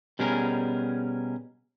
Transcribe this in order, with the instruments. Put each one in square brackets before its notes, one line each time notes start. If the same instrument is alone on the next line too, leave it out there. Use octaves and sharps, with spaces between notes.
[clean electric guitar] B2 G3 C#4 G#4 A#4